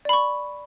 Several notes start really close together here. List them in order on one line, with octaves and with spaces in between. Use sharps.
D5 B5 C#6